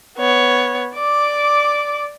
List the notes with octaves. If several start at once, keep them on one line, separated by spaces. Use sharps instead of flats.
B3 C#5
D5 D6